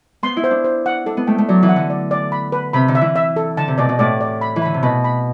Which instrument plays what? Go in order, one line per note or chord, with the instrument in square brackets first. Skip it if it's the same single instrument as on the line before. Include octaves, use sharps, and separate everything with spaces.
[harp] B3 [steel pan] C6
[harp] E4
[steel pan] C5
[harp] D4
[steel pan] C5
F#5
[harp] D4 [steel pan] A4
[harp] B3
[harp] A3 [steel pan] G5
[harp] A3
[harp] F#3 [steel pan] D5
[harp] E3
[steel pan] F#5
[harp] D3
[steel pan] D5
D5
B5
B4
[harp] C3 [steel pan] B5
[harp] D3
[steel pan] E5
[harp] E3
[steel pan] E5
A4
[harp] D3 [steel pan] A5
[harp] C3
[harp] B2 [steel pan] D5
[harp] B2
[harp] A2 [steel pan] D5
[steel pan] D5
B5
[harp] E3
[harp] D3 [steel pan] B5
[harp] C3
[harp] B2 [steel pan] B5
[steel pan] B5